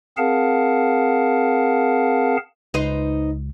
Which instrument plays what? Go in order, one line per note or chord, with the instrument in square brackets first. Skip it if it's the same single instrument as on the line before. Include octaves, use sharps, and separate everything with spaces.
[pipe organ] C4 G#4 A#4 F5 F#5 A5
[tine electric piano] C#2 [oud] D#4 B4 C5